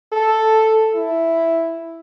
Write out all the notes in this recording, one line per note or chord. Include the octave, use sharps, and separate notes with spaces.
A4
E4